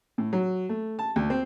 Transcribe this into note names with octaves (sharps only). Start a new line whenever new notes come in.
A2
F#3
A3
A5
D2
C4